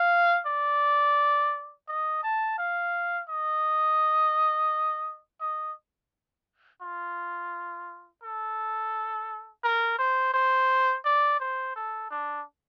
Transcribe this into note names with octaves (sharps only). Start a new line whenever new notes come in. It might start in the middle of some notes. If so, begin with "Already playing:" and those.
Already playing: F5
D5
D#5
A5
F5
D#5
D#5
F4
A4
A#4
C5
C5
D5
C5
A4
D4